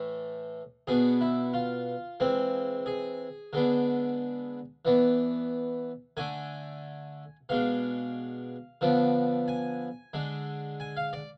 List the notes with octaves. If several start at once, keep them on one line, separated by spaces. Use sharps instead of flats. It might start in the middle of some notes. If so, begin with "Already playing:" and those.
Already playing: A2 E3 A3
B2 B3 D4 G#4
E4
F4
E3 G#3 C4
G#4
D3 G#3 B3 D4
E3 B3 D4
D3 A3 D4 G#5
B2 G#3 D4 F5
D3 F3 B3 D4
G#5
D3 G#3 D4
G#5
F5
D5